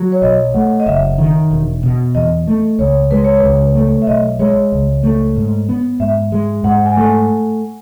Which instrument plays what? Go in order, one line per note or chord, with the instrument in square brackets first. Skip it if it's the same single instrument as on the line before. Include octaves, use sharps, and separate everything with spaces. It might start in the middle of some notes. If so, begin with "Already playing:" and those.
Already playing: [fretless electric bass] F#3
[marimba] C#5
[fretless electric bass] B1 [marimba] D#5
[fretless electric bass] A3 [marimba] F#5
[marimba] D#5
[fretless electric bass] F#1 [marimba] E5
[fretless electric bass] D#3
E1
B2
[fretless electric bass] E2 [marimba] D#5
[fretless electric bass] A3
[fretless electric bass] C#2 [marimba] C#5
[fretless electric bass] G#3 [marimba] B4
[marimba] C#5
[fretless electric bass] C#2 [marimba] B4
[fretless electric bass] A3
[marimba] E5
[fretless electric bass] B1 [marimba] D#5
[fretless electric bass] G#3 [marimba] C#5
[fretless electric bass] C#2
A3
G#2
B3
[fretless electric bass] G#2 [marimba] E5
[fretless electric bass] G#3
[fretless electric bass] G#2 [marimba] F#5
[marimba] G#5
[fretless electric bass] A3